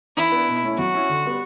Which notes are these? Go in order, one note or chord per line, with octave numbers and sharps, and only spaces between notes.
E3 E4
B3 D4
B2
A3 C#4 E4
F#3 F#4
C#4 E4
D3
G3 B3